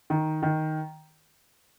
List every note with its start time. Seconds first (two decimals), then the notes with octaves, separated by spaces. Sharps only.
0.10 D#3
0.43 D#3